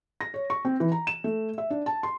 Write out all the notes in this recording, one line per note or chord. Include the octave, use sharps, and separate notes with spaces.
A#6
C#5
C#6
C4
E3
A#5
E7
A3
E5
D4
A5
C6